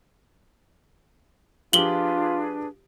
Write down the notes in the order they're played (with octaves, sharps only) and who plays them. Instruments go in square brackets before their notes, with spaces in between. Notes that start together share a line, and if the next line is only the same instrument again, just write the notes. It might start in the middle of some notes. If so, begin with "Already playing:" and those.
[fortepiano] F3 G4 [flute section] D4 G#4 B4 [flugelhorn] F4 [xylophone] F#7 G7